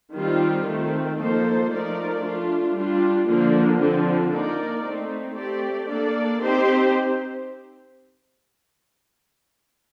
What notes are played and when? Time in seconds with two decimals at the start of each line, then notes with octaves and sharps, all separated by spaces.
0.14 D#3 G3 C4 F4
0.66 D#3 A3 C4
1.18 F3 A#3 D#4 A4 C5
1.70 F3 A3 D#4 A#4 D5
2.23 A3 D4 F4
2.75 G3 D4 F4
3.27 D3 F3 A#3
3.80 D3 F3 C4
4.32 A#3 D#4 A#4 D5
4.83 A3 C4 D#4
5.36 A3 C4 G4 D5
5.88 A#3 D4 A4 D5
6.40 C4 D#4 G4 C5